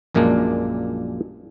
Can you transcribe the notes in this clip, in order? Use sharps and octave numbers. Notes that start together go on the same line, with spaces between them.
A#1 F#2 A#2 G#3 A#3 D4